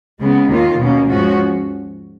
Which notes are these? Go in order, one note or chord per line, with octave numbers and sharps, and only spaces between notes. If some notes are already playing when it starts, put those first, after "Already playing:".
C#3 G#3 B3
D#2 D#3 A#3 F4
B2 A#3 C#4
G#2 F3 G#3 C#4 F#4